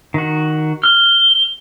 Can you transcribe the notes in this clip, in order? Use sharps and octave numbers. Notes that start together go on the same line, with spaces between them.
D#3 F#4
F6 G7